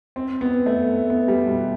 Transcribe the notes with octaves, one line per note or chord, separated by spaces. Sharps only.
C4
B3
A3
B3
G3
B2